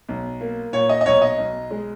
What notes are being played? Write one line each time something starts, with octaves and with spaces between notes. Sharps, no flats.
B1
A#3
A#2 C#5
D#5
D#5
B1 C#5
D#5
B1
G#3